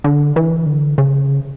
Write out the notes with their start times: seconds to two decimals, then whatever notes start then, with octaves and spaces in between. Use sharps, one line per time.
0.04 D3
0.36 E3
0.66 D3
0.98 C#3